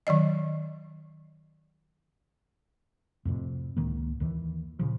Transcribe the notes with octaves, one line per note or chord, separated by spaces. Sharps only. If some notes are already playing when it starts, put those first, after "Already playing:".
D#3 F#3 D5 D#5
F2 A2 C3
C#2 A2 D#3 A#3
D#2 D#3 E3
A#2 C#3 F3